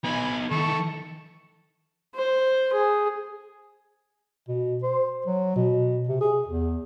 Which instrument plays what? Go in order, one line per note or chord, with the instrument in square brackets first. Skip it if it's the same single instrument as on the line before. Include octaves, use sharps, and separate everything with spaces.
[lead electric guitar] B3 D#4 [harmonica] G#5 B5
[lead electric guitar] D#3 E3 [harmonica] A4 C#6
[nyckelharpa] C5
G#4
[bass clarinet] B2
C5
F#3
B2
C3
G#4
E2